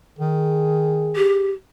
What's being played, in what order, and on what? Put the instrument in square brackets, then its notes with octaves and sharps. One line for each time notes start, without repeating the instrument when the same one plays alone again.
[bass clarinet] D#3 [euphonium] G#4
[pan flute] G4